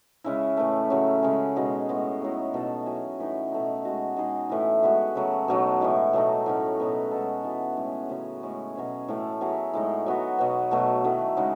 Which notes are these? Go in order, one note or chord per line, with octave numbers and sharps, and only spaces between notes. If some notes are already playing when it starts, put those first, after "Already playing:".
C#3 G#3 C#4 E4
A2 E3 A3
C#3 F#3 C#4
C#3 G#3 C#4 G#4
B2 G#3 D#4 F#4
A2 G#3 B3 D#4
A2 F#3 B3 D#4
B2 A3 D#4 A4
F#3 C#4 E4 G#4
A2 E3 B3 D#4
B2 A3 D#4
G#3 D#4 F#4
G#3 D#4 G#4
A2 E3 A3 E4
G#3 B3 F#4
C#3 F#3 A3
B2 F#3 A3 D#4
A2 E3 G#3
B2 F#3 A3 D#4
A2 F#3 C#4
B2 F#3 B3
G#3 B3 D#4 A4
E3 B3 F#4 A4
A2 G#3 C#4 G#4
C#3 F#3 C#4
A2 G#3 C#4
B2 F#3 C#4 G#4
A2 E3 A3 C#4
F#3 B3 E4 G#4
A2 G#3 D#4
F#3 B3 F#4
B2 F#3 B3
B2 F#3 A3
D#3 F#3 A3 E4
C#3 G#3 D#4 F#4